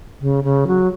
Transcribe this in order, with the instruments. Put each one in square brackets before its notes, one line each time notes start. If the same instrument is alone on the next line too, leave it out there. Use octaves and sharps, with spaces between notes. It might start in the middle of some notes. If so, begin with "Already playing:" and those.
[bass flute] C#3
C#3
F#3